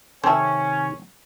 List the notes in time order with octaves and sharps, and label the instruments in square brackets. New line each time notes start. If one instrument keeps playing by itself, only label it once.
[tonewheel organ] C3 D#3 [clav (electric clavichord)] C4 C5 C#5 [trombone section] C#4 [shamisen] A4 E5